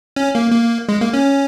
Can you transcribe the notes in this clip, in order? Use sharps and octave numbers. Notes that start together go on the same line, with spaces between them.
C#4
A#3
A#3
G#3
A#3
C#4